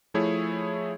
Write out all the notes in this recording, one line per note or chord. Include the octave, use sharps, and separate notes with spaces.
F3 A3 E4 G#4 C#5